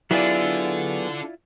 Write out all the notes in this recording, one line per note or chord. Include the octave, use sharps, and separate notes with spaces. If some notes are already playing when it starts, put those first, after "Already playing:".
F#3 B3 D4 E4 F4 G#4 A4 D5